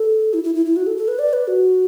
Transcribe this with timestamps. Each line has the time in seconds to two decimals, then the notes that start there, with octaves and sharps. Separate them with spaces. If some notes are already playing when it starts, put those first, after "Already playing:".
Already playing: A4
0.34 E4
0.44 E4
0.55 E4
0.66 E4
0.76 F#4
0.87 A4
0.97 A4
1.08 B4
1.19 D5
1.33 B4
1.48 F#4